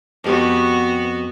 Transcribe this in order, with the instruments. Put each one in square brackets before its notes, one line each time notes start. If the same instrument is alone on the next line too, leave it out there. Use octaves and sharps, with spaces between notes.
[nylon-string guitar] F2 G4 [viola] B3 F#4